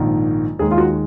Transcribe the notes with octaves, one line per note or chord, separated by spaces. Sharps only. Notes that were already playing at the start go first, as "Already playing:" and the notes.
Already playing: A#1 G#2 D#3
D#2 D#3 G#3 G#4
F4
F#4